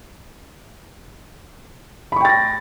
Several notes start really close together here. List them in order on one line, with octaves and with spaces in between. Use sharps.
B5 C#6 G5 A6 A#6